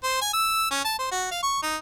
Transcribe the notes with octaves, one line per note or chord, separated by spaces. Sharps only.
C5
G#5
E6
C#4
A5
C5
F#4
F5
C#6
D#4